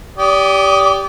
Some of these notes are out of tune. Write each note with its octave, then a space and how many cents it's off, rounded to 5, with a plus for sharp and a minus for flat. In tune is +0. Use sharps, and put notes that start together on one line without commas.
G4 +0 D5 -30 D#6 +0